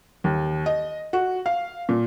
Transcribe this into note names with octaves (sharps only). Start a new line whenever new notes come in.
D#2
D#5
F#4
F5
A#2